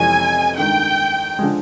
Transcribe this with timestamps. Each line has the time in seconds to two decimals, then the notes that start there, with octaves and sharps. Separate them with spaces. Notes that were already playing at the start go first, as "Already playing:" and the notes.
Already playing: F2 C3 E3 G#3 C#4 G#5
0.57 G2 D#3 G#3 G5
1.39 D3 F3 G#3